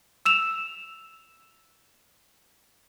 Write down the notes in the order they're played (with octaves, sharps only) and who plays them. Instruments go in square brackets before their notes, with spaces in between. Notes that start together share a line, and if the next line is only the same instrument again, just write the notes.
[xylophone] E6 E7 F7